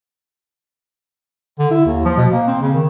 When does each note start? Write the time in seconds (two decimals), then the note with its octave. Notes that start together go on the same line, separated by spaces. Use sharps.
1.59 D3
1.71 E4
1.86 D#2
2.05 F3
2.18 B2
2.33 A#3
2.47 C4
2.62 C#3
2.74 D#3